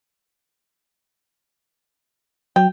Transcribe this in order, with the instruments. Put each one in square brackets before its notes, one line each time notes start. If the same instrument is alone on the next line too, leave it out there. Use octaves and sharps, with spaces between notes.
[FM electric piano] F#3 [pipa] G5